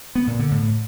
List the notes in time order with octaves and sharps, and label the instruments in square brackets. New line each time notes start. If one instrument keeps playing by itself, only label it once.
[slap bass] B3
A#2
D3
A2